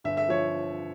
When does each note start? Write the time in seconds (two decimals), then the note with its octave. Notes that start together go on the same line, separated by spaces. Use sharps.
0.04 G1 E5
0.17 E5
0.29 F3 C#5